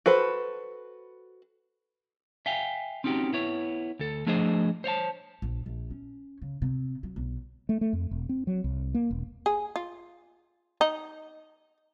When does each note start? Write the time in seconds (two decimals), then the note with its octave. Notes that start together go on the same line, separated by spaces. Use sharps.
0.06 F#4 A4 B4 C5
2.46 E5 F5 G5 G#5
3.04 C4 C#4 D#4 F#4 G4
3.33 B3 E4 C#5
3.99 D2 A4
4.26 F3 A3 D4 G#4 C5 D#5
4.84 C5 C#5 E5 A5
5.42 A#1
5.66 A#1
5.91 C#4
6.42 C#3
6.62 C3
7.03 F#3
7.16 B1
7.69 A3
7.81 A3
7.93 F2
8.11 E1
8.29 C4
8.47 F#3
8.64 C2
8.94 A#3
9.11 E1
9.46 G#4
9.76 F4
10.81 D#4